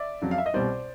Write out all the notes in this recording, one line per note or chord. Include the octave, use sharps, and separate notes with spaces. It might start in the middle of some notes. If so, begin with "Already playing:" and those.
Already playing: D5 E5
F2 C#3 F#3
F5
E5
D#5
C2 B2 G3 C5 D5